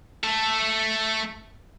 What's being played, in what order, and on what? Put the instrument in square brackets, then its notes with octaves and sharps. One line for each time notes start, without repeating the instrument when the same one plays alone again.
[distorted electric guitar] A3 A4